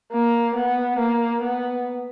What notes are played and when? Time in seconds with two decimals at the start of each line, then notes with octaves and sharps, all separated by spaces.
0.12 A#3
0.56 B3
0.99 A#3
1.43 B3